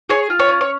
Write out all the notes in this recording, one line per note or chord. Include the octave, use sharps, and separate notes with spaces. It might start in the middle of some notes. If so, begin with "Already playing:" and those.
G#4 C#5
F4
C#5
C#4
C#5